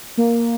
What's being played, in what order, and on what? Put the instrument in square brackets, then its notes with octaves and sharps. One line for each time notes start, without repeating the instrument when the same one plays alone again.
[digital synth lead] A#3